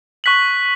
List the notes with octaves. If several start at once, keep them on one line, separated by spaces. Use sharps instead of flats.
C#6 F#6 B6 F#7